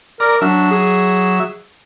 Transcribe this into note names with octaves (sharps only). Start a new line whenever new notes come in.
A#4 D5 A#5
F#3 D4 E5
G#4